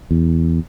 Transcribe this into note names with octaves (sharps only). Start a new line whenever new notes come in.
E2